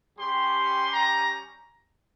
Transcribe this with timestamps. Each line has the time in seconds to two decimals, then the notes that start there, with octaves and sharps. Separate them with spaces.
0.18 G3 C#4 G4 C6
0.93 A#5